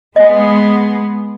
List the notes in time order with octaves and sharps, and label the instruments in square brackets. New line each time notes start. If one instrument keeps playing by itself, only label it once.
[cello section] G#3 B3 G#4 [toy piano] D#5 G#5